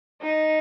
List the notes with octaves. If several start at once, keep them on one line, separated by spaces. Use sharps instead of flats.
D#4